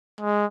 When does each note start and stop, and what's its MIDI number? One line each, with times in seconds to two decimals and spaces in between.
0.21 0.46 56